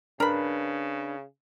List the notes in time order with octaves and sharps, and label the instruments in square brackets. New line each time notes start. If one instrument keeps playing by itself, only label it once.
[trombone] C#3 [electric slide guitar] D4 B4 [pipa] A#4 B5